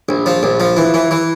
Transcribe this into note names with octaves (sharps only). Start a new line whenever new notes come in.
A#1
F3
A#1
F3
E3
E3
E3